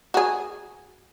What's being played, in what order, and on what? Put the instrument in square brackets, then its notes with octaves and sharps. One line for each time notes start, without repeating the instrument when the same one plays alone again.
[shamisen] F#4 G#4